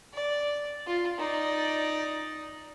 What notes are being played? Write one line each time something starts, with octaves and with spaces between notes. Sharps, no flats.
D5
F4
D#4 D5